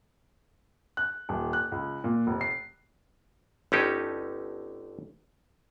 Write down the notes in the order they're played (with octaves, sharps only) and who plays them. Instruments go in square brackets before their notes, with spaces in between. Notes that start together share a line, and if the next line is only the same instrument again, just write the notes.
[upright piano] F#6
D#1
F#6
C#2
A#2
F1
C7
[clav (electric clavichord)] G1 D3 C#4 D#4 G4 A4